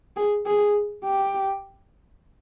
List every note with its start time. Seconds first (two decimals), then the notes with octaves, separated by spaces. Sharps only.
0.16 G#4
0.46 G#4
1.04 G4